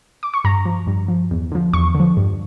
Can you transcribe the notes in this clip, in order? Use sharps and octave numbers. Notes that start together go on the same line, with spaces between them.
D6
C#6
G2 A#5
F3
G2
F3
E2
D3 F3
E2 C#6
D3
F3
G2